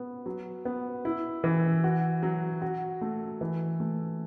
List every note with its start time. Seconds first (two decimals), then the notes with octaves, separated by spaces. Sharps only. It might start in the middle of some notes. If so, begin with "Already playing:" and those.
Already playing: B3
0.26 F#3
0.65 B3
1.05 E4
1.44 E3
1.84 F#4
2.23 F#3
2.62 F#4
3.01 A3
3.41 E3
3.80 A3